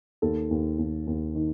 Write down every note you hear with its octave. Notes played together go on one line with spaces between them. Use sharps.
D#2 A4
D#2
D#2
D#2
D#3